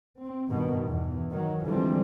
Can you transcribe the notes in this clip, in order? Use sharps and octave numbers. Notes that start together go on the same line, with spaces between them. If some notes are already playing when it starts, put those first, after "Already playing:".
C4
G2 B2 D#3
E2
D#3 F#3
D3 E3 F3 G3 G#3 C4